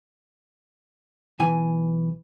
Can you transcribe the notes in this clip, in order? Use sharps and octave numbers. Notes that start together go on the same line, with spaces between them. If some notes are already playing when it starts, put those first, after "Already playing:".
B1 E3 G#5